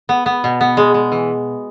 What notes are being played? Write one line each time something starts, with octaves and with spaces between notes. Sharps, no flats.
B3
B3
B2
B3
G#3
G#3
E3